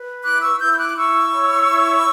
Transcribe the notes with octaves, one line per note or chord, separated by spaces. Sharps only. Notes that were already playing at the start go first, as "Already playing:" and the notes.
Already playing: B4
E4 D6 F#6
C#6 E6
E4 E6 G6
G6
D6 F#6
F#6
E4 C#6 E6
C#5
E4